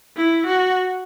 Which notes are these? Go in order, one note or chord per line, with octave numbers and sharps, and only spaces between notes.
E4
F#4